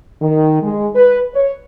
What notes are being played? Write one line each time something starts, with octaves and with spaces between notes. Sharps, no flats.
D#3
G#3
B4
C#5